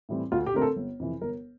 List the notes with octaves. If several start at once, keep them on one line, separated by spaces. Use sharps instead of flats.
A2 E3 G3 C4
D2 F4
G4
D3 A3 C4 A#4
A4
G1
F2 C3 E3
G1 A#4